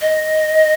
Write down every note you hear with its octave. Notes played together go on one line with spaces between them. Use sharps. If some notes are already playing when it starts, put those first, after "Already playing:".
D#5